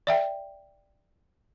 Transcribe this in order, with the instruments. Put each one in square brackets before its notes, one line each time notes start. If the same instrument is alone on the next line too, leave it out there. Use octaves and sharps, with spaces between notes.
[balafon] D5 E5 G5